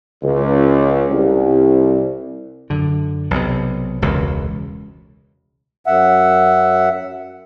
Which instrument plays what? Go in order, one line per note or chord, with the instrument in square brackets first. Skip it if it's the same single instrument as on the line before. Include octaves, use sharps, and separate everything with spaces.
[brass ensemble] C#2
C2
[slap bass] F#2 D3
B1 C3
E1 C#2
[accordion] F#2 E5 F#5